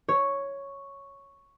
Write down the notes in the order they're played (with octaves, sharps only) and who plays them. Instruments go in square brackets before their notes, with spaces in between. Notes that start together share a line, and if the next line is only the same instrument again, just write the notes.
[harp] C#5